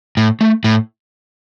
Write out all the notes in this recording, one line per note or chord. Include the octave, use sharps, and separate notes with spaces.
A2
A3
A2